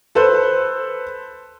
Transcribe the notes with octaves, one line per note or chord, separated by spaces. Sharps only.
A4 B4 C5